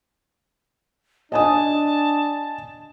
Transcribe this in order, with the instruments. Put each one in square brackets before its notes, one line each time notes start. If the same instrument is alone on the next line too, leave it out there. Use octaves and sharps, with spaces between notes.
[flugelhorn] D4 [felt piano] D#5 G#5 D#6 [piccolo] A5